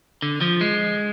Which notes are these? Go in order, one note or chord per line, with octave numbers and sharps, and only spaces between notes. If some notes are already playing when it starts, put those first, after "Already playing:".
D3
F3
G#3